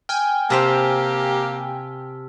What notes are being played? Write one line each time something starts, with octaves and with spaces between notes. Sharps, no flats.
G5 G#5 F6
C3 A#3 C4 G4 C5 A5 E6 B6